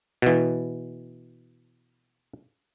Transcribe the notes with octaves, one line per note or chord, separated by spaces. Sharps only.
B2 E3